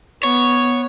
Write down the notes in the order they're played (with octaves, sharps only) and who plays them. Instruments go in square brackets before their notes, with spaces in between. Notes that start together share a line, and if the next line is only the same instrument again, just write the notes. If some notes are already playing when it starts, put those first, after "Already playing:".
[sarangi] B3 [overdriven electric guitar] C#5